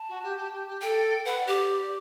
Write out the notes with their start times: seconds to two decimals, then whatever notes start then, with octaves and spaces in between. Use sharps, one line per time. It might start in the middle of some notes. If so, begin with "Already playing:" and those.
Already playing: A5
0.08 F#4
0.23 G4
0.37 G4
0.52 G4
0.67 G4
0.81 A4 G5
1.25 B4 F#5
1.40 D5
1.47 G4
1.54 D5
1.69 D5